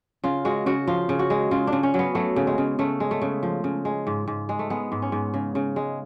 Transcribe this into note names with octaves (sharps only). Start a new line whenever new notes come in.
C#3 F4
G#3 F#4
C#3 F#4
F3 F4
C#3
F#4
G#3
C#3 F4
D4
C#3
C#4
F#3
B3
F#3 A3
C#3
G#3
C#3
C#3 A3
G#3
A3
C#3
F3
C#3
G#3
G#2
G#2
G#3
A3
G#3 B3
G#2
C#4
G#2
C#3
C#3
G#3